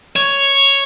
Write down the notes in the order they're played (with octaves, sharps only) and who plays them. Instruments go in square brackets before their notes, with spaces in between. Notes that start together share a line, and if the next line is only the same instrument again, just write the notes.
[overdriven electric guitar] C#5